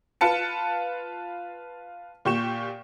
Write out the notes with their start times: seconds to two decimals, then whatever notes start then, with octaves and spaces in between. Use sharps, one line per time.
0.21 F4 B4 A5 C#7
2.25 A#2 G4 C#6 E7